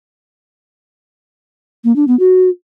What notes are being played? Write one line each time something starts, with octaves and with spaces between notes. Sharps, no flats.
A#3
D4
B3
F#4